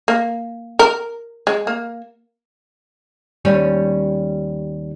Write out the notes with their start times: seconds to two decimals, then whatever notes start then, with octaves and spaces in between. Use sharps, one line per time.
0.08 A#3
0.79 A#4
1.47 G#3
1.67 A#3
3.45 D#2 G3 C#4